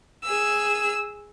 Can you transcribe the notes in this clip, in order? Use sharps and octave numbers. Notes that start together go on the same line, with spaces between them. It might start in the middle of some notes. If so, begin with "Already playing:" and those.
G#4 E6